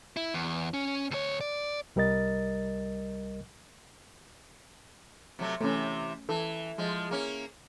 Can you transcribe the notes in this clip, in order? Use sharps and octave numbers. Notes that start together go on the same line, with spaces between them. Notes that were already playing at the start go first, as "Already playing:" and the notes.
E4
E2
C#4
D2 C#5
D5
C2 G3 A#4 D#5 A6
C3 F#3 A3
C3 E3 A3 C#4
E3 A4
F3 G#3
A#3 C#4